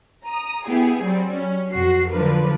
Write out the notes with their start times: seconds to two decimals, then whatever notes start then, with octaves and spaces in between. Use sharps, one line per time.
0.25 A#5 D#6
0.68 B3 E4 G4 G#4
1.02 F#3 G3 C4
1.37 C#4
1.74 F2 F#4 C7
2.13 D3 F3 F#3 D4 A#4 B4